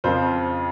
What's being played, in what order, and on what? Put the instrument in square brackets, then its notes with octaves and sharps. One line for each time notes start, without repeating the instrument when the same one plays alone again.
[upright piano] F2 C#3 F3 C5